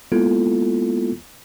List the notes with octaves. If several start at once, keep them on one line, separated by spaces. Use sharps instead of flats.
G#3 A#3 B3 E4 F4 A4